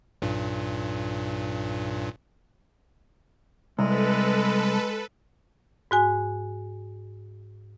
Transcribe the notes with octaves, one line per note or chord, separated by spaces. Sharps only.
B1 G2 A#2
C2 G#3 A4 B4
G#2 F#4 G#5